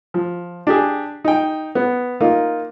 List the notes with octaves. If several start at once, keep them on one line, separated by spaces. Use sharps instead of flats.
F3
D4 G4 G#4
D#4 G5
B3
A#3 D#4 F4